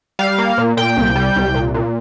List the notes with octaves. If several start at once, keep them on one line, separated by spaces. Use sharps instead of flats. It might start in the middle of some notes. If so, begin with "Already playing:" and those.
G3 F5
A#3
A#2
A#2 G5
C2
G3
C2
A#2
A#2